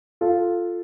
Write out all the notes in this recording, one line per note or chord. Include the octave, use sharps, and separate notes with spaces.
F4 A4